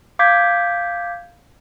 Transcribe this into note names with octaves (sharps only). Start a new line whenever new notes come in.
F5 D6 G6 G#6 B6